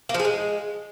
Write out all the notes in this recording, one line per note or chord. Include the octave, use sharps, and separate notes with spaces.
A#3
F3
G#4
G#3